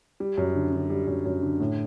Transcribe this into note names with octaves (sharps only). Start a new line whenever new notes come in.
G3
F#2
D3
D3
G3
F#2
F#2
D3
A2